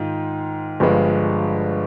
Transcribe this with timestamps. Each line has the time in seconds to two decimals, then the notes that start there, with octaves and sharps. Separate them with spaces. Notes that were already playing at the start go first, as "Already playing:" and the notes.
Already playing: G#2 D#3 F4
0.80 G1 G2 F3 G#3